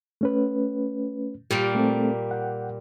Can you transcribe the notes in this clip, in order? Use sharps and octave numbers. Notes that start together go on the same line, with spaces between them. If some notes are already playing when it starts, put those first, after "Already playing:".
A3 C#4 B4
A#2 G3 A#3 G4
A3 C4 A4
F#5 G5